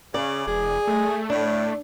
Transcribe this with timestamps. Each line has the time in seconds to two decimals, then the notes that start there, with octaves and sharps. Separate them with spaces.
0.14 C#3 D5
0.47 E1 G#4
0.87 A3
1.30 A2 D4